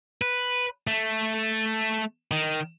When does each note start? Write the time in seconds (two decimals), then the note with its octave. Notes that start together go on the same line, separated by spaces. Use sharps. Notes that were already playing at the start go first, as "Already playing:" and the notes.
0.22 B4
0.87 A3
2.31 D#3